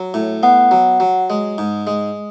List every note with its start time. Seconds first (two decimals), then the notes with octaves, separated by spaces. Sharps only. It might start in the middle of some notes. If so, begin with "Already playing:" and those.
Already playing: F#3
0.14 A2
0.43 B3 F#5
0.71 F#3
1.00 F#3
1.30 G#3
1.58 G#2
1.87 G#3